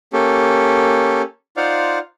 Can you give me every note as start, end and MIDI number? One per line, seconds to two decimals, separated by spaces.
0.13 1.22 58
0.13 1.22 61
0.13 1.22 67
0.13 1.22 69
1.57 1.99 63
1.57 1.99 65
1.57 1.99 72
1.57 1.99 74
1.57 1.99 77
1.57 1.99 78